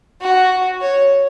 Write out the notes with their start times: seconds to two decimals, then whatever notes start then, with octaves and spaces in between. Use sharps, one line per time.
0.21 F#4
0.81 C#5